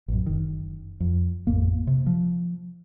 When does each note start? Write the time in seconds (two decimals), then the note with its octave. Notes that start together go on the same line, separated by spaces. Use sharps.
0.08 A1 F#2
0.26 F#1 D#3
1.00 F2
1.47 A1 F2 A#3
1.87 C3
2.06 F3